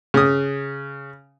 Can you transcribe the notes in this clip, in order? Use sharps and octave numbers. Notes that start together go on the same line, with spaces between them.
C#3 D#6